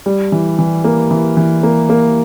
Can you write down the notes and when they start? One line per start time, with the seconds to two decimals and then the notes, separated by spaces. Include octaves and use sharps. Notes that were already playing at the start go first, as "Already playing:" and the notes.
0.06 G3
0.32 E3
0.58 E3
0.84 A#3
1.11 E3
1.37 E3
1.63 A#3
1.90 A#3